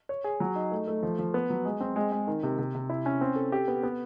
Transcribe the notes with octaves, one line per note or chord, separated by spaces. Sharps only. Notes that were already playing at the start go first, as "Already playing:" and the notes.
C#5
G#4
F#3
D#4
A3
A3
F3
F3
B3
F#3
G#3
C4
G#3
G#3
D#3
C3
C3
C3
E4
C#4
C4
A4
G4
B3
B3